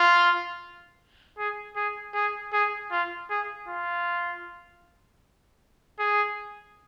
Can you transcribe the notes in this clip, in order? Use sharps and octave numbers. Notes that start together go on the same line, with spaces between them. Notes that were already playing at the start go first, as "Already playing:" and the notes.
Already playing: F4
G#4
G#4
G#4
G#4
F4
G#4
F4
G#4